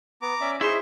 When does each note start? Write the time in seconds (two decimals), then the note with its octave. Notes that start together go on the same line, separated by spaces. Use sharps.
0.22 B3 A#5 D6
0.41 C#4 D5 E5
0.61 D#4 E4 G#4 C5 E5 C6 C#6